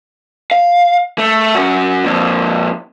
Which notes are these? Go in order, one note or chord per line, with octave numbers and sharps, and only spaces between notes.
F5
A3
F#2 F#4
F2 A#2